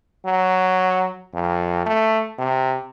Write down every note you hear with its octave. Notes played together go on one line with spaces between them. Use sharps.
F#3
F2
A3
C3